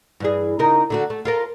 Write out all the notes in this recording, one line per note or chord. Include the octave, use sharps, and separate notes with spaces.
G2 E3 G#4
C#3 D#4 A#4
D3 A3 F#4
A3
F4 A4 A#4